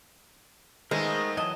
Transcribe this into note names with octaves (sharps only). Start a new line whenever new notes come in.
D#3 G#3 A3 B3 A#4 C5 D#5
E3 F#3 D#5 A5